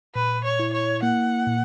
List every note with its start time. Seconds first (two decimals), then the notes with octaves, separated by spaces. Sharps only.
0.15 A#2 B4
0.44 C#5
0.60 E4
0.73 C#5
1.03 A#3 F#5
1.47 A#2